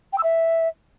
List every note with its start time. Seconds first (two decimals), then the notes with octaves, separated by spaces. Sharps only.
0.13 G5
0.18 E6
0.23 E5